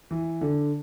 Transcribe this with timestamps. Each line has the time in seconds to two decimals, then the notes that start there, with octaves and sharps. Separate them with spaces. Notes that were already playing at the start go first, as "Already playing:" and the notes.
0.11 E3
0.41 D3